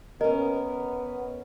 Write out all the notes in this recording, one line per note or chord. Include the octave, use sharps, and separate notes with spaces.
B3 C#4 A#4 D#5